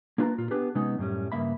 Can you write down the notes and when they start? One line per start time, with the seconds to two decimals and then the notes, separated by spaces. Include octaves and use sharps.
0.18 A#3 D4 F4 B4 G#5 A#5
0.38 A#2 F4
0.51 B3 D4 G4 G#4 B4
0.75 C3 G#3 B3 C#4 D#4
0.98 F#2 A2 G3 C#4
1.32 G2 C#3 A#3 E5 B5